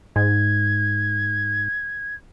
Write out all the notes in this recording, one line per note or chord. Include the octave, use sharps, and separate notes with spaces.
G#2 G#6